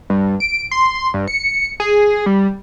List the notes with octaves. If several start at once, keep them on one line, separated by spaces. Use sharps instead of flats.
G2
D7
C6
G2
C#7
G#4
G3